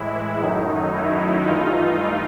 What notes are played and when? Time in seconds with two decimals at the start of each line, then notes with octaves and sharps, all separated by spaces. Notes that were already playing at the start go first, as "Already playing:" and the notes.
Already playing: A2 E3 G#3 E4
0.39 F#2 D#3 F#3 A3 D#4
0.92 E4
1.44 G2 E3 A3 D#4 F4